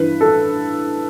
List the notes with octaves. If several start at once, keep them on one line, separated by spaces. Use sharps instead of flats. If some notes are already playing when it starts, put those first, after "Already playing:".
Already playing: G2 E3 B4
A4